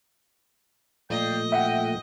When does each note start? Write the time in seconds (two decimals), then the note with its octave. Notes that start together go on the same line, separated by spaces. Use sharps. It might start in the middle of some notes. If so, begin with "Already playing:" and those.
1.10 A#2 F3 A3 D5 D#5 F5 G5
1.52 E5 F#5 G5